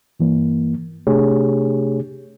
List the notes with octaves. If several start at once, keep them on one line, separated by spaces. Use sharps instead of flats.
G2 E3 A#3
C3 A3 D4 G4 G#4 C#5